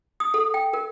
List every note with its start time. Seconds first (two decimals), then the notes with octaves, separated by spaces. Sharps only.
0.20 D#6
0.34 A4
0.54 G5
0.73 A#4